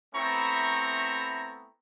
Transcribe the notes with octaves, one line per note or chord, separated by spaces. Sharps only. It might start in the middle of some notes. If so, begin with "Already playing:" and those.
A3 B3 C4 E4 A#5 C#6